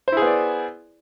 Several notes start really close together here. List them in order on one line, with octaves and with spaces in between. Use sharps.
C5 E4 G#4 B3 D5